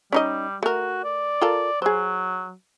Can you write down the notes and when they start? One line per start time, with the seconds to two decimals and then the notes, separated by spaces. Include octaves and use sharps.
0.12 G3 C#4 D#4 D#5
0.63 A3 F#4 A#4
1.04 D5
1.41 F4 A4 A#4
1.82 F#3 G#4 C5